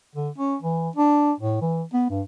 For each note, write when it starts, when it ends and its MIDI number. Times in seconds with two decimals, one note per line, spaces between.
0.15 0.29 50
0.38 0.56 61
0.62 0.89 52
0.96 1.32 62
1.40 1.61 45
1.62 1.83 52
1.93 2.06 59
2.10 2.22 43